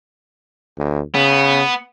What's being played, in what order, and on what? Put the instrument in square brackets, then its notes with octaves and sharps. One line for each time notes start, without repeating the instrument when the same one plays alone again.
[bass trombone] D2
[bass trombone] C#3 [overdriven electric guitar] B3